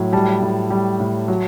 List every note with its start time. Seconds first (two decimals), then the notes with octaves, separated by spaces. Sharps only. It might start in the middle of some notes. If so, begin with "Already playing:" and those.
Already playing: A2 F#3
0.13 G3 A5
0.42 A2
0.70 G3
1.00 A2
1.28 F#3